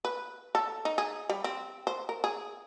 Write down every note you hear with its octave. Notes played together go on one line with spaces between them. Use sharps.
B4
A4
D#4
G#4
G3
C4
C5
A#4
G#4